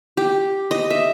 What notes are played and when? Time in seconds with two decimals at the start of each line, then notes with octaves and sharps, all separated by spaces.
0.17 G4
0.71 D#5
0.90 E5